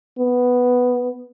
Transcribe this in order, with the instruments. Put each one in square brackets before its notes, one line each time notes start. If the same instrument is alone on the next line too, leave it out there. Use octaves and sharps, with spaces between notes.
[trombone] B3